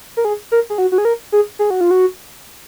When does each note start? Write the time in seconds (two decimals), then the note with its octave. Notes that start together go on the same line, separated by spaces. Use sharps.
0.17 A#4
0.25 G#4
0.52 A#4
0.70 G#4
0.78 F#4
0.92 F#4
0.98 G#4
1.05 A#4
1.32 G#4
1.59 G#4
1.70 F#4
1.81 F4
1.91 F#4